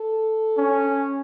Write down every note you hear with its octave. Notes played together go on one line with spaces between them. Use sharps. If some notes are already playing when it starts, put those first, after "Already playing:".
Already playing: A4
C#4